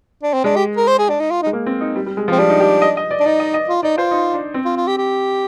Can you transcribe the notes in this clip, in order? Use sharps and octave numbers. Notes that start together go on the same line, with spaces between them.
D4
C4
G#3 D4
G4
A#4
C5
G#4
D4
D#4
F4
D#4
G#3
A#3
C4
D#4
G3
G3
G#3
F3
C4
G3 D4
D#4
G4
D#5
D#5
D5
D4
D#4 D5
D#5
D#5
F4
D#4 D5
F4 C5
D#4
D4
C4
F4
F4
G4
G4